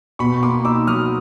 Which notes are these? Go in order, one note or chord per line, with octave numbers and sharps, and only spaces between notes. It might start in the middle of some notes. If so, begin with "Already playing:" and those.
B2 B5 C#6
A#3 C6 D6
D#4 D6 E6
F#3 D#6 F6